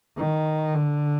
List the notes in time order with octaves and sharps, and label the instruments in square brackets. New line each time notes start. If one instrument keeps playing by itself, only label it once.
[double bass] D#3
D3